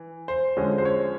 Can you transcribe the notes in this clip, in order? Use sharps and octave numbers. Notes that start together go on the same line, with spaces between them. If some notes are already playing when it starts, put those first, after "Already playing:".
Already playing: E3
C5
D3 F3 G#3 C#4
C5
C#5